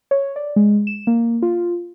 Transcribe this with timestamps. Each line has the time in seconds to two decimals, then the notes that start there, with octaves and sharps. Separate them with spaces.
0.11 C#5
0.36 D5
0.56 G#3
0.87 E7
1.07 A#3
1.42 F4